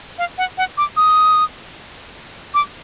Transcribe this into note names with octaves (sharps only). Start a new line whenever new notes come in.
F5
F#5
F#5
D6
D#6
D6